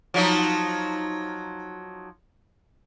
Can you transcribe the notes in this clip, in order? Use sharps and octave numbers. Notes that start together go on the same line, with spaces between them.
F3 F#3 D#4